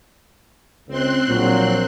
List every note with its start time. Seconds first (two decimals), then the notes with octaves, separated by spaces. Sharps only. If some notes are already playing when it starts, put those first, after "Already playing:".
0.88 C#2 C4 C6 F#6
1.29 A#1 A#2 F#3